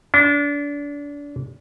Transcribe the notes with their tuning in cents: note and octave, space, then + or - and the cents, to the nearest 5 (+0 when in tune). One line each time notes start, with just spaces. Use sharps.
D4 -30